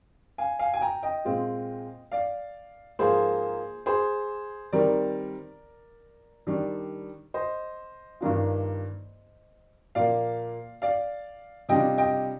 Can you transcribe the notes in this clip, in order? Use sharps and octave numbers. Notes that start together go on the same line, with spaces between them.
F5 G#5
F5 G#5
G#5
G5 A#5
D#5 G5
A#2 G#3 C4 F4
D5 F5
G#2 F3 A#3 F4 G#4 C5
G#4 C5
D#3 G3 C4 A#4 D5
D#3 G3 D4
C5 D#5
G2 D#3 A#3 D4 F4
A#2 F3 A#3 D5 F5
D5 F5
C3 G3 D4 F4 D#5 G5
D#5 G5